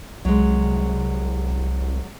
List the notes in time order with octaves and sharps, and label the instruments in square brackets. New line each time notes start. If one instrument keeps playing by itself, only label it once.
[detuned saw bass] C2 [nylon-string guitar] F#3 G#3